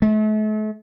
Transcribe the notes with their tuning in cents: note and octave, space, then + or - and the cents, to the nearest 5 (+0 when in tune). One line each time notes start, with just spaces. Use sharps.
A3 -40